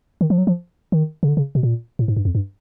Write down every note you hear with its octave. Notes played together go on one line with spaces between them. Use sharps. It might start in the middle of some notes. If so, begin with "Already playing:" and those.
D#3
F3
F#3
F3
D#3
C#3
D3
C#3
B2
A#2
A2
G#2
G2
F2
G2